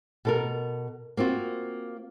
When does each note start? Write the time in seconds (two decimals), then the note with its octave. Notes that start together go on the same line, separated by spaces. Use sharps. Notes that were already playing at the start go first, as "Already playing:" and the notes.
0.25 B2 A4 A#4
1.17 A#3 C4 F4 F#4